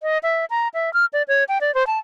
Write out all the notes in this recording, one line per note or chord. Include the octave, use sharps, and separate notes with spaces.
D#5
E5
A#5
E5
F6
D5
C#5
G5
D5
C5
A5